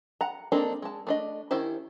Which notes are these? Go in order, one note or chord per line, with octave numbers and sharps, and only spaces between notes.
F#5 A#5
A#3 C4 D4 D#4 A4
G#3 A5
A3 D4 D#5
D#3 C#4 E4 G4 C5